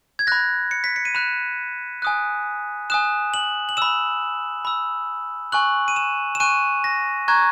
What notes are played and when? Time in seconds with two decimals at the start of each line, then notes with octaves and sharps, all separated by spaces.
0.19 G#6
0.27 B5 F#6 A#6
0.71 C#7
0.84 B6
0.96 C#7
1.05 D#7
1.15 B5 F#6 E7
2.02 G#5 D#6 F#6
2.90 G#5 D#6 F#6 E7
3.34 F#7
3.69 F#7
3.77 B5 E6 E7
4.65 B5 E6
5.52 G#5 C#6 F#6 F#7
5.88 D#7
5.96 E7
6.35 E7
6.40 G#5 C#6 F#6 D#7
6.84 A#6
7.28 A#5 C#6 F#6 G#6